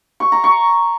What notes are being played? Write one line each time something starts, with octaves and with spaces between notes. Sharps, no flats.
C#6
A#5
C#6